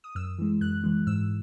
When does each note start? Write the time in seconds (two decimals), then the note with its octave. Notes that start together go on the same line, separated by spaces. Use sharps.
0.04 D#6
0.15 F#2 E6
0.39 E3 G#3
0.61 F#2 F#6
0.84 E3 G#3
1.07 G#2 E6